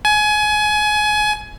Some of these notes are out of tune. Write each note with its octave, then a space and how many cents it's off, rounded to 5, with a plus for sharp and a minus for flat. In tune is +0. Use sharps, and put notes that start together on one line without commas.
G#5 +25